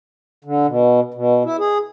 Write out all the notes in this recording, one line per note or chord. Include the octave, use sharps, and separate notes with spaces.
D3
B2
B2
E4
G#4